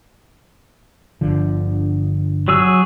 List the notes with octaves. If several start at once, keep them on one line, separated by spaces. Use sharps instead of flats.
G1 D3 F3
F#3 G#4 E6